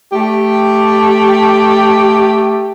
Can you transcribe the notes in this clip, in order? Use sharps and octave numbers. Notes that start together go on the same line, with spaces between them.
A3 G4